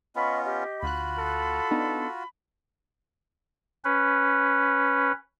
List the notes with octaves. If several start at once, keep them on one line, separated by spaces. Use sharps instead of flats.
B3 C#4 F4 D#5 B5 C#6
G4 D#5
D2 F4 F#4 B5 F#6
A4
B3 D4 D#4
C#4 B4